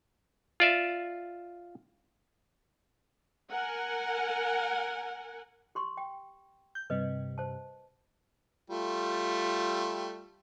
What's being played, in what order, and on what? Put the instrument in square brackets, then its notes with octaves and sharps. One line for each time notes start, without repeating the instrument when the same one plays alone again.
[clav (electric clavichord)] F4 D5 E5
[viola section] A#4 F#5 G#5
[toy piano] G4 C6 C#6
G5
[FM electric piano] G6
[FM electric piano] G2 C3 G3 [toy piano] B4 D#5
[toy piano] C5 A5
[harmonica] G3 A3 [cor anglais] F4